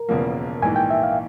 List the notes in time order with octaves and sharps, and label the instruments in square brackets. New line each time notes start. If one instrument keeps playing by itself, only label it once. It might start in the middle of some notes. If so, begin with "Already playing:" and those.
Already playing: [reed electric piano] A#4
[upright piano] E1 E2 C#3 F3 A#3
[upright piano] A#1 G#2 E3 [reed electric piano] G#5
[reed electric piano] G5
E5
F5